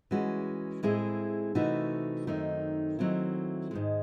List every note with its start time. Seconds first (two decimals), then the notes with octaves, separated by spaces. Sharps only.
0.11 E3 G#3 C#4 F#4
0.83 A2 G#3 C4 E4 G#4
1.55 C3 E3 A3 D#4 F#4
2.27 F#2 D#3 A3 C4 D#4
2.99 D#3 F#3 A3 C4 E4
3.71 G#2 D#3 G#3